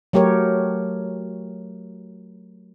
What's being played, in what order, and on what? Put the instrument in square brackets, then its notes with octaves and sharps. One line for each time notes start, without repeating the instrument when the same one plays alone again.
[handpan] F#3 A3 G4 A#4 C#5